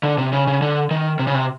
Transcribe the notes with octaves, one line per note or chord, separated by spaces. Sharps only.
D3
C3
C#3
C#3
D3
D#3
C3
C#3
C3